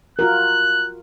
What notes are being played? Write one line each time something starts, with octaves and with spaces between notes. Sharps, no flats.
F4 F#4 A#4 F#6